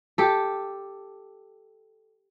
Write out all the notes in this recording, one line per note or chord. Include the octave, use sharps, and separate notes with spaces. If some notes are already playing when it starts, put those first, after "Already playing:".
G4 A4